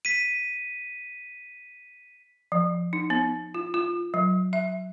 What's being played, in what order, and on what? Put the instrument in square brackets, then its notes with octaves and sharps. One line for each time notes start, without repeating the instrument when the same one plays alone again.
[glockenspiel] B6 D#7
[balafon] F3
D#4
B3
F4
F4
F#3
E5